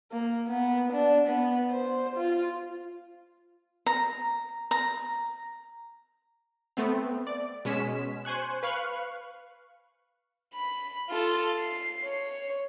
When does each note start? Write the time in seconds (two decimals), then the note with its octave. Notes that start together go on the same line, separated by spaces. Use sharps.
0.12 A#3
0.48 B3
0.93 D4
1.27 B3
1.71 C5
2.16 F4
3.86 A#5
4.71 A#5
6.77 A3 B3 C4
7.27 D5
7.65 B2 G#3 C#4 B6 E7
8.25 C5 G#5 C#6 F#6
8.63 B4 F5 C#6 F#6
10.53 B5
11.10 F4 A4
11.59 C7
12.05 C#5